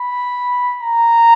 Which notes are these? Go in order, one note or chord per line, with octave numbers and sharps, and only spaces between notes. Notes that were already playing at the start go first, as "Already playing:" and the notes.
Already playing: B5
A#5